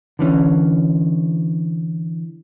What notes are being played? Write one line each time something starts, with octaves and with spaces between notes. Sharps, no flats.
D3 E3 C#4